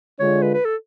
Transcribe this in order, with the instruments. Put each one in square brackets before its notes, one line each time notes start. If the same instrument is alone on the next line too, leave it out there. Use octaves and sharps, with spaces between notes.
[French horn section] D3 G#3 D4 F4 [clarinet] C#5
[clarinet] B4
B4
A4